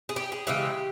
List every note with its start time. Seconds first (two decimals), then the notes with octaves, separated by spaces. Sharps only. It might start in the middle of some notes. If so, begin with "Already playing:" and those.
0.09 G#4
0.16 G4
0.32 G#4
0.47 C#3 E3 G#3 G4